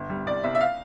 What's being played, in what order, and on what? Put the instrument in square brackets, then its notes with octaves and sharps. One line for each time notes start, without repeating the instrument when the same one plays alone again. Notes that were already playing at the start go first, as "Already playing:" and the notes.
Already playing: [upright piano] G1
G3
C2 D5
C2 E5
E5
F5